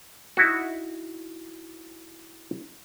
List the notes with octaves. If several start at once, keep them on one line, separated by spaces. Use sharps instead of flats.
D#4 E4 F#4